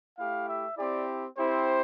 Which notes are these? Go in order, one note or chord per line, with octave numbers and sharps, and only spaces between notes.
A3 E4 G4 F5
E5
C4 E4 G4 D5
C4 E4 G4 C5